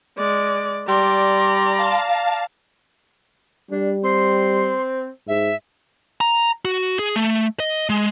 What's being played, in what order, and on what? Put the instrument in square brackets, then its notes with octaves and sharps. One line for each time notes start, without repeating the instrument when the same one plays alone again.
[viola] G#3 D5
[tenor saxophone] G3 [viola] D5 A#5 [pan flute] C6
[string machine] F5 A5
[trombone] G3 [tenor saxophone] D4
[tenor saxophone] C4 [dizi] C6
[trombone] G#2 [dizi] E5
[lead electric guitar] A#5
F#4
G#4
A3
D#5
G#3